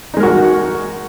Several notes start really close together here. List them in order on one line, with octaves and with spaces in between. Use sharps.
D#4 G#3 A#4 F#4